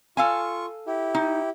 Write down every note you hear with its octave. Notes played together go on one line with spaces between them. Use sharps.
F4 A4 F5 G#5 C#6
E4 G4
D#4